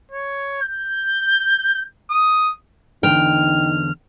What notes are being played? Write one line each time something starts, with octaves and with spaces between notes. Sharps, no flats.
C#5
G6
D#6
E2 D3 D#4 G5 F6